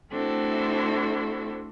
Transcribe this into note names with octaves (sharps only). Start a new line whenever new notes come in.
A3 C4 D4 E4 F#4 A4